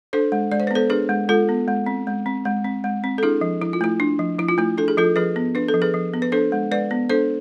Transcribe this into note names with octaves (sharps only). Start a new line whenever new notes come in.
D4 A4 C5
G#3
G#3 D5
C5
B4
B3 A4 C5
D4 G#4 B4
G#3
G#3 F4 A4
B3
G#3
C4
G#3
C4
G#3
C4
G#3
C4
A4
D4 E4 G#4
F3
F3 E4
F4
A3 E4
D4
F3
F3 E4
F4
A3 E4
D4 A4
G#4
F3 F4 A4
F3 G#4 B4
B3
D4 B4
A4
F3
G#4 B4
F3
B3
B4
D4 A4 C5
G#3
G#3 B4 D5
B3
D4 A4 C5